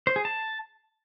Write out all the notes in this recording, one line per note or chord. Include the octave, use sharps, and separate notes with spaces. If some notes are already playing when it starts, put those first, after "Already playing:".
C5
G#4
A5